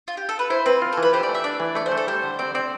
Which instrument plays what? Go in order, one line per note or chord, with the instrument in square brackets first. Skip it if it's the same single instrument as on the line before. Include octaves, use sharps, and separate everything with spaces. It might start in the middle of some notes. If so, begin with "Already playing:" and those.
[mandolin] F4
G4
A4
B4
[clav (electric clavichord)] E4 [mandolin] C5
[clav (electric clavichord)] C4 [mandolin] B4
[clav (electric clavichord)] F4
[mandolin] A4
[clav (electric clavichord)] E3
[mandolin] B4
[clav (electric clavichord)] G4 [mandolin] C5
[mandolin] D5
[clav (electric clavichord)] A3
[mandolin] E5
[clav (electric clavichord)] D4 [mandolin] D5
[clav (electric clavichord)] E3
[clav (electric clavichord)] A3 [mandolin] D5
[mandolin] C5
[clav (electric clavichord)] A3
[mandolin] A4
[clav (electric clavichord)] G3 [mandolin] C5
[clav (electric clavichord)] D3
[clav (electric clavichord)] C4 [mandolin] D5
[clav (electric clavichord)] C4 [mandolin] D5